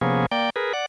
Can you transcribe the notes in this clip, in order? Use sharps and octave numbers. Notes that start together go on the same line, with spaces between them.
C3 F3 A#3 B3 C#4 G#4
A#3 D5 G5
G#4 A#4 B4
D5 F#5